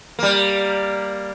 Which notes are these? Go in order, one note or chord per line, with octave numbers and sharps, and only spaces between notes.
G3 A#3